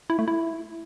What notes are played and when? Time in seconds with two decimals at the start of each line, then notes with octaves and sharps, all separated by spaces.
0.10 E4
0.19 A3
0.28 E4